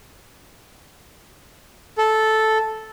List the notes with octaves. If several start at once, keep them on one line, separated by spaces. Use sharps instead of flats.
A4